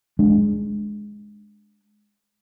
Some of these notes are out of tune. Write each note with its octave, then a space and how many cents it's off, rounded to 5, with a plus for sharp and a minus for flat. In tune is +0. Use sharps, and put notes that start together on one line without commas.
G#3 +5 D4 +0